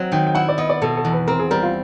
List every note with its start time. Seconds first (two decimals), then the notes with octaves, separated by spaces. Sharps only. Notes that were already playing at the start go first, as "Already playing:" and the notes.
Already playing: F#3 C4 D#4
0.12 D#3 G5
0.27 G5
0.35 E4 F#5
0.49 D5
0.58 B3 D#5
0.69 D5
0.82 B2 A4
0.97 A4
1.05 E2
1.13 B4
1.28 C4 A#4
1.39 G#4
1.51 G3 A#4
1.62 F4